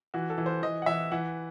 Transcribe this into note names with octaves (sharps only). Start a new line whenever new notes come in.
E3 F#4
A4
E3
C5
E3 D#5
F#5
E3 E5
E3 F#5